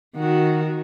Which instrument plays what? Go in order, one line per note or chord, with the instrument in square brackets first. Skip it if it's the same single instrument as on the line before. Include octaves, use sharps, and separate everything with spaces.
[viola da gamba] D#3 F#4